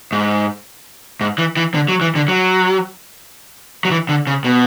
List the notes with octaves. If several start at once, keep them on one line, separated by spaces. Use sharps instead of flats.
G#2
G#2
E3
E3
D3
F#3
E3
D3
F#3
F#3
E3
D3
C#3
B2